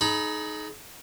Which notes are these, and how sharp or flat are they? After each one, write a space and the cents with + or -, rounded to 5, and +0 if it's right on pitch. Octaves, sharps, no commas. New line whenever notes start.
D#4 +0 G#4 +40 B5 +0